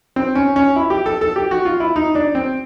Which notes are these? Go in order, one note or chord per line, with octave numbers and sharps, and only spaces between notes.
C4
C#4
C#4
E4
G4
A4
A4
G4
F#4
F4
E4
D#4
D4
C4